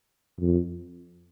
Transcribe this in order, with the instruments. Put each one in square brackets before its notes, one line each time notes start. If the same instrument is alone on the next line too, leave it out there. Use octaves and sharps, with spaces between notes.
[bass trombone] F2